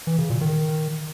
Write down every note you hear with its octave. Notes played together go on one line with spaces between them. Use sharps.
E3
C#3
A#2
D#3